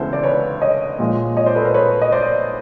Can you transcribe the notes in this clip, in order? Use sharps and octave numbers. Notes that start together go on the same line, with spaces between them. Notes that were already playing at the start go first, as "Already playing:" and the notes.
Already playing: D2 C#3 E3 G#3 B3 A4 B4 C5
D5
B4 C#5
C#5 D#5
A#2 F3 G#3
C#5 D#5
C5 D5
A4 B4
A#4 C5
B4 C#5
D#5
C5 D5